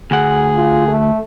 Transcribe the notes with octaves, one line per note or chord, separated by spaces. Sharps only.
D2 G#4 F#5
F4
A3